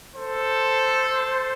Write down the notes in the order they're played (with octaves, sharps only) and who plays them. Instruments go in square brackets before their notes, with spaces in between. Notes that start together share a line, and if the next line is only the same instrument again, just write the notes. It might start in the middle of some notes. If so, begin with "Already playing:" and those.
[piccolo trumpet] A4 [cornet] C5